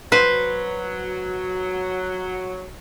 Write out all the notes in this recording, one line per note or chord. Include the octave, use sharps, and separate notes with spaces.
F#3 B4 C5